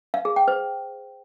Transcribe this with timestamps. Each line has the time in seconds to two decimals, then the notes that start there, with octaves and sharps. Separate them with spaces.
0.14 F5
0.25 G#4
0.36 G5
0.48 C5